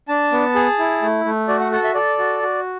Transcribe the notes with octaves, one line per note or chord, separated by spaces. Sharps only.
D4 A5
B3
G#4
E4
A3
A3
F#4 D5
F#5
A4 F#5
E5
A4 D5
F#4
F#4